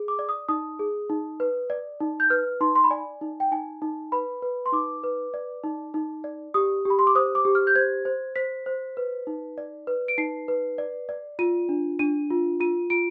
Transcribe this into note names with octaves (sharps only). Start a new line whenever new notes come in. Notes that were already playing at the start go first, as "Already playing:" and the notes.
Already playing: G#4
D6
D5
D#6
D#4 D#6
G#4
D#4
B4
D5
D#4
G6
B4 F6
D#4 C6
C6
B5
D5 G#5
D#4
G5
D#4 G#5
D#4
B4 B5
B4
C6
D#4 D6
B4
D5
D#4
D#4
D5
G4 D#6
G4
B5
C6
D6
C5 D#6
D6
G4
F6
G6
C5 G#6
C5
C5 B6
C5
B4
D#4
D5
B4
D7
D#4 C7
B4
D5
D5
F4 D#7
D4
D4 D#7
F4
F4 D#7
F4 D7